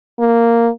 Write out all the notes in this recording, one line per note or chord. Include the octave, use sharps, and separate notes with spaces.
A#3